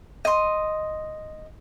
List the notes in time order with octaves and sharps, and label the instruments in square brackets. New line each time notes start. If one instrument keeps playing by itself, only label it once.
[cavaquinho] D#5 C6